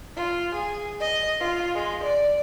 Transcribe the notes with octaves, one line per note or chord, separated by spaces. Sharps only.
F4
G#4
D#5
F4
G#3
D5